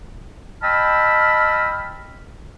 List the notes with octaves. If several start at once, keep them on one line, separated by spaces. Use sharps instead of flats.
D#5 G5 A5 B5 E6 F6